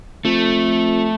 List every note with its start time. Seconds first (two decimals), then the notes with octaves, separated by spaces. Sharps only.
0.25 F2 A3